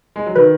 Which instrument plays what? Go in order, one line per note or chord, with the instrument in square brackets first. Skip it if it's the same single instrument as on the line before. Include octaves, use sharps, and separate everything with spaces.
[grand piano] G#3
F#3
[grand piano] D#3 [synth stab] B4